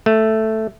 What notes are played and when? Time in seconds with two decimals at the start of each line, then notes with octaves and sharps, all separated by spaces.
0.06 A3